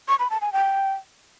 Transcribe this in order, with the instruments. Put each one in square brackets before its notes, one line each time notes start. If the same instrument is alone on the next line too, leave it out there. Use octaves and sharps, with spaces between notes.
[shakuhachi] C#6
B5
A5
G#5
G5